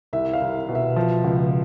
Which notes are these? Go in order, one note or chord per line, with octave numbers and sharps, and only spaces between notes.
C2 E5
F5
C2
B2
E5
F3
C#2